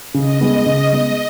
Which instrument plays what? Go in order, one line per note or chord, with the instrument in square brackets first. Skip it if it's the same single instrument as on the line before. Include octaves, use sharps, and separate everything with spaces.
[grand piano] C#3 [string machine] D#5
[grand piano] G#3 B3
C#3
G#3 B3